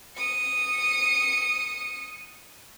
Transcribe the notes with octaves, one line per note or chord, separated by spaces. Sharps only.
D#6 C#7